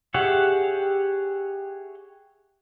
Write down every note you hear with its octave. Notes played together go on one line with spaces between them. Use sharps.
G4 G#4 C#5 E5 F#5